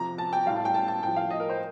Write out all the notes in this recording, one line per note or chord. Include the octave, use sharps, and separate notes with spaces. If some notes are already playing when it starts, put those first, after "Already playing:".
Already playing: F2 C3 F3 A#5
A5
G5
A2 G3 F5
A5
G5
A5
A5
A2 F3 G5
F5
D#5
A#4
C5